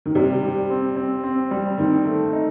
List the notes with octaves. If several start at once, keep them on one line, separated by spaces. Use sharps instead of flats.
D#3
C3 G3
G3
C4
C4
C4
G3
D#3 C4
A3
D#4